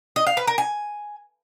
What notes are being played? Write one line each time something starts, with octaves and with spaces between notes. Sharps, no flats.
D#5
F5
B4
A#4
G#5